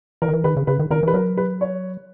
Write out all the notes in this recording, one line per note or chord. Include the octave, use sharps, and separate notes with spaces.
E3 A#4
D#3
E3
D#3 B4
C#3
C#3 B4
D#3
D#3 A#4
E3 B4
F#3 A#4
B4
C#5